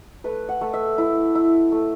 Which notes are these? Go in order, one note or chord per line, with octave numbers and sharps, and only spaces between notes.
A3 B4
F#5
A3
E5
E4
E4
A3